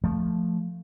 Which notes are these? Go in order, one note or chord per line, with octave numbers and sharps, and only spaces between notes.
F3 A3